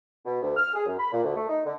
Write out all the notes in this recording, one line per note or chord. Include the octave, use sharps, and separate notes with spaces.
B2
D2
F6
G#4
F#2
B5
A#2
D2
A3
D#4
D3